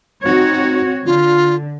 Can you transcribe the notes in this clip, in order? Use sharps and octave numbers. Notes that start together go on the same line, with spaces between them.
C4 D#4 F#4 C#5
D3 F4